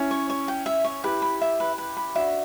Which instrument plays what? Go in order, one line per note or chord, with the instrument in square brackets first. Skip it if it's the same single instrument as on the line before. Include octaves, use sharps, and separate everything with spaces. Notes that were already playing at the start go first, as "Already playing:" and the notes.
Already playing: [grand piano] C#4 E4
[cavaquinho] C#5
C#5
G5
E5
C#5
[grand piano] E4 G4 [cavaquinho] B4
[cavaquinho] B5
E5
B4
B4
B5
[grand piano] D4 F#4 [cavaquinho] E5